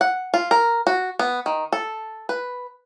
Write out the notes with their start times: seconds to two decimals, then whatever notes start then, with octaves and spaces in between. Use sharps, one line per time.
0.01 F#5
0.34 F4
0.51 A#4
0.87 F#4
1.19 B3
1.46 D#3
1.73 A4
2.29 B4